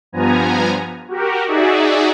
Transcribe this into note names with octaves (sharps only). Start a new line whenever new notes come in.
G2 F3 B3 G#5 A#5
F#4 G4 A#4
D#4 F#4 G#4 D5 E5